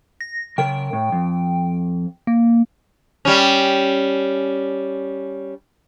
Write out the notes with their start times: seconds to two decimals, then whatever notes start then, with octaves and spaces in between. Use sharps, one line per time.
0.21 A#6
0.58 C#3 A#4 G5
0.93 A2
1.12 F2
2.27 A#3
3.25 G3 C#4